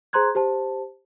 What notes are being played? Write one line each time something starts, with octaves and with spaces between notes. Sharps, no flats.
G#4 C5 A#5 C6 F#6 G#6
G4 C5 A5